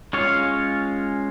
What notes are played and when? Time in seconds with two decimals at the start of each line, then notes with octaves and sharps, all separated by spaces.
0.13 G#3 C#4 F4 C#5 F5